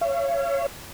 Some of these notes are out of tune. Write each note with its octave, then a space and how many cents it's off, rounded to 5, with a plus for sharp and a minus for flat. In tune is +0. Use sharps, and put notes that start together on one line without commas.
C#5 +0 F5 -45